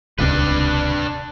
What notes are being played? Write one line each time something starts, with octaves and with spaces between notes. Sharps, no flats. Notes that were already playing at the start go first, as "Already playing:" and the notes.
D#1 C#2 C3 D4 B4